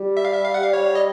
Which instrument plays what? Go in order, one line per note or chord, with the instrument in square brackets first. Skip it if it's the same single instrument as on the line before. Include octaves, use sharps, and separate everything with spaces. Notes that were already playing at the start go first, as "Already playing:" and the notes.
Already playing: [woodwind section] G3
[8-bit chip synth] E5
F5
E5
F5
F#5
F5
C#5
D#5